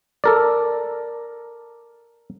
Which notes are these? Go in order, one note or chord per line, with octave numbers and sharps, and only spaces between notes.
A4 A#4 D5